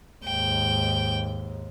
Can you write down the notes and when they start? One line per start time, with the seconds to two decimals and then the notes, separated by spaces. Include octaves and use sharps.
0.25 D#2 G#2 G5